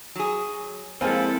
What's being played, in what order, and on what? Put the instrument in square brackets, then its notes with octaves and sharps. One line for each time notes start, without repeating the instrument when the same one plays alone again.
[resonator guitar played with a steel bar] F#3 G#4
[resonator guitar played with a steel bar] F2 A#3 G#5 [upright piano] G#3 C4 [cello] E4 A4